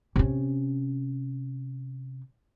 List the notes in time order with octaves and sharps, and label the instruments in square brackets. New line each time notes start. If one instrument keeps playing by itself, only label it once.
[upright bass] C3 C#4